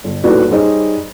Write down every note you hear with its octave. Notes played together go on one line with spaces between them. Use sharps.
G1
D#1 D#2 A2 B3 F#4 D5
G3 D#4 G#4 C5 C#5 D#5